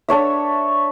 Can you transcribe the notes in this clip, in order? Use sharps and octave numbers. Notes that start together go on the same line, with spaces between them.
D4 A4 C#5 E5